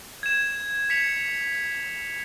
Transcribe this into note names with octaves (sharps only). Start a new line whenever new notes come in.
G#6 E7
B6 C#7 F7